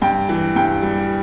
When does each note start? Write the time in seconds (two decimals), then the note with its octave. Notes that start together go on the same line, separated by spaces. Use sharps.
0.02 G2 G5
0.29 E3
0.56 G2 G5
0.82 G3